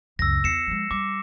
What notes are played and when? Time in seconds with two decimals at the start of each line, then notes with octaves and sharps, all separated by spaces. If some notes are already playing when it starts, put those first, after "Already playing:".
0.19 C#2 F#2 E6 A#6
0.44 E2 C7 C#7 E7
0.67 F3 G#3
0.91 G3 D6